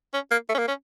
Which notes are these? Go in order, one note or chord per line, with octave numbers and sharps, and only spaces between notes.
C#4
A#3
A3
C#4
A#3
C#4